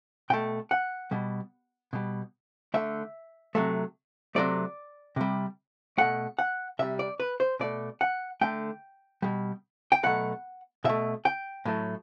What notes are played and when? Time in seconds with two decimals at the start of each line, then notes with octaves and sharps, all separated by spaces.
0.30 B2 A3 G5
0.71 F#5
1.11 B2 G3
1.93 B2 G3
2.74 D3 A3 E5
3.55 C3 F#3 A3
4.35 C3 F#3 A3 D5
5.16 C3 G3
5.98 B2 A3 F#5
6.39 F#5
6.79 C3 G3 E5
6.99 D5
7.20 B4
7.40 C5
7.60 B2 A3 D5
8.01 F#5
8.41 D3 A3 G5
9.22 B2 G3
9.92 G5
10.03 B2 F#3 A3 F#5
10.84 B2 A3 E5
11.25 G5
11.65 A2 F#3 A3